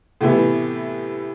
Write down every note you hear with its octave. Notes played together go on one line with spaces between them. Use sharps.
A2 C3 E3 B3 E4